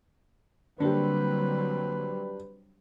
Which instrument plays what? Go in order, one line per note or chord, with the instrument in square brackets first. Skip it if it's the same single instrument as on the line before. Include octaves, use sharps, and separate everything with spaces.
[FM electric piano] D3 A#3 [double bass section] F#3 G3 C4 [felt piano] D4 G4 [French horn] B4